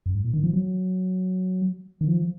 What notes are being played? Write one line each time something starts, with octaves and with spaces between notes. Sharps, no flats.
F#2
G#2
A#2
D#3
F3
F#3
D#3
F3